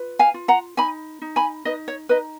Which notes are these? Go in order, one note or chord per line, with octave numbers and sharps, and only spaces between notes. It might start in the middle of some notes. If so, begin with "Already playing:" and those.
Already playing: F4 B4
F5 G#5
F4
F#5 A#5
D#4 G#5 B5
D#4
G#5 B5
D#4 B4 D#5
C#5
D#4 B4 D#5